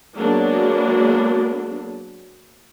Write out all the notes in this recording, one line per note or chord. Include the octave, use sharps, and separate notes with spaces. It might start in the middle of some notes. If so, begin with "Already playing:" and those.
F#3 G#3 A#3 B3 D4